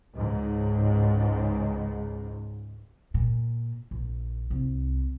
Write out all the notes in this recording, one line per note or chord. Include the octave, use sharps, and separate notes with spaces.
C#2 G#2
A#2
A#1
C2